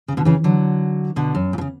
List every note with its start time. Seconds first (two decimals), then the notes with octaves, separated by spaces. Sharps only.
0.08 C#3
0.17 B2 D3
0.25 C#3 E3
0.44 D3 F#3
1.16 B2 D3
1.35 F#2
1.53 A#2
1.58 B2
1.61 C#3